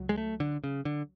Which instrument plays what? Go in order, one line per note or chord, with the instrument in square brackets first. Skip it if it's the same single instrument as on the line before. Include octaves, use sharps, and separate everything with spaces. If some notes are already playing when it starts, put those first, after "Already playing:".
Already playing: [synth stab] C#2 F#3
[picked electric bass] G#3
A3
D3
C#3
D3